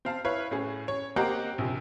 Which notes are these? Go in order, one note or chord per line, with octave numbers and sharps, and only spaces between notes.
C4 F5 A5
E4 B4 C#5 F5
A2 C#4 G#4
C#5
A#3 C4 G4 D#5 F#5 A#5
A#1 C3